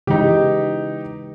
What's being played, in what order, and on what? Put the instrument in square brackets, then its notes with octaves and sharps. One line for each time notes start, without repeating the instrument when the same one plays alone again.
[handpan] C#3 E3 G#3 [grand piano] D#4 G4